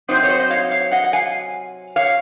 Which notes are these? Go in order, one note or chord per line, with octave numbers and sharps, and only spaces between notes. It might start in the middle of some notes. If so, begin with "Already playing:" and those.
C3 F#3 C4 D#4 C5 D#5
C#5
C5 D#5
D#5
C#5 F5
C#5 F5
D#5 F#5
F#5
F5 G#5
C#5 F5